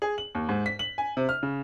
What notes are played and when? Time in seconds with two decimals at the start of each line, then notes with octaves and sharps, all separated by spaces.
0.02 G#4
0.18 F#7
0.35 D#2
0.49 G#2
0.66 B6
0.79 F#7
0.98 G#5
1.17 C3
1.29 F6
1.43 C#3